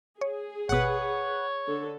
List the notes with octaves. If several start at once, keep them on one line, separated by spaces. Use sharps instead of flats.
G#4 C#5
G#1 B2 B4 C#5 F#5
D3 A4